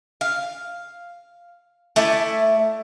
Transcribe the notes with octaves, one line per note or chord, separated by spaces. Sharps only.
F5
A3 E4 D5 A5